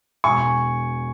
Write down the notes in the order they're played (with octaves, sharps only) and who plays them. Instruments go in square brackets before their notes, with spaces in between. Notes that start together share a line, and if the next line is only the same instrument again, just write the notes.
[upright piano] E1 G#5 C#6